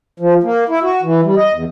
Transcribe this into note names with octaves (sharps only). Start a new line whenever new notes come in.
F3
A#3
E4
F#4
E3
G3
D#5
E2